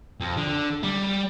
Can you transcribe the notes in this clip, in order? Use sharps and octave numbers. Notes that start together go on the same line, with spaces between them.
F2
D3
G3